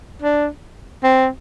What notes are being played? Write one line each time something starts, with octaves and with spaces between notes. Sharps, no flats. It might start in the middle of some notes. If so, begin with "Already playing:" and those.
D4
C4